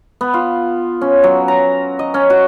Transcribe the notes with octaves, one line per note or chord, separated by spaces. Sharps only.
B3
F4
C#4
F#3
A#5
D#5
C#4
F#4